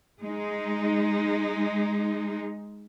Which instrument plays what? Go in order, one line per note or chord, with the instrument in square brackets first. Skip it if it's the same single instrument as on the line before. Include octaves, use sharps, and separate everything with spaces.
[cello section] G#3 D#4